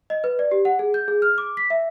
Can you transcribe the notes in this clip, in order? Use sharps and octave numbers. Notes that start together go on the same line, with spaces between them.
D#5
B4
D5
G4
F#5
G#4
G6
G#4
F6
D6
B6
E5